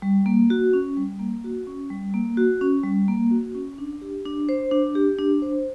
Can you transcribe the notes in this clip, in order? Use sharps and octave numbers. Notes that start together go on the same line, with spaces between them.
G3
A#3
F#4
C#4
G3
A#3
F#4
C#4
G3
A#3
F#4
C#4
G3
A#3
F#4
C#4
D4
G4
D4
C5
D4
G4
D4
C5